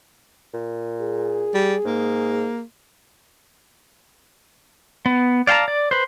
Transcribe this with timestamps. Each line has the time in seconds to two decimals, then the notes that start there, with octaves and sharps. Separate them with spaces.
0.54 A#2
1.01 G#4
1.54 G3
1.85 G#2 A#3
5.06 B3
5.47 D5 F5 G5 A5 A#5
5.68 D5
5.91 B4 C5